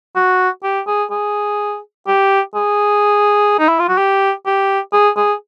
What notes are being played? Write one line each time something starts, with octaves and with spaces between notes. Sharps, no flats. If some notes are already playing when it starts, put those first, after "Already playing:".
F#4
G4
G#4
G#4
G4
G#4
D#4
E4
F4
F#4
G4
G4
G#4
G#4